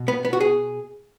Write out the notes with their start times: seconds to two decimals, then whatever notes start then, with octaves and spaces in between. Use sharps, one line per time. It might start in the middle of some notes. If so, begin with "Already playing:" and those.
Already playing: B2
0.08 B3
0.25 B3
0.33 F#4
0.40 G#4